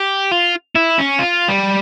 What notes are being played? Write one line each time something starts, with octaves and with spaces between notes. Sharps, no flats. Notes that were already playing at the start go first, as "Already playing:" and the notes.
Already playing: G4
F4
E4
C#4
F4
G3